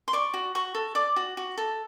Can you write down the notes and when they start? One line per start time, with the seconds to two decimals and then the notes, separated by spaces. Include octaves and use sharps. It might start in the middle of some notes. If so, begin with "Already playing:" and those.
0.08 C6
0.13 D5 C#6
0.34 F#4
0.55 F#4 C#6
0.75 A4
0.95 D5 D6
1.16 F#4
1.37 F#4
1.58 A4